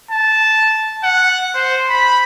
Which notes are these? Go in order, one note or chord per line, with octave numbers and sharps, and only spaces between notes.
A5
F#5
C5
B5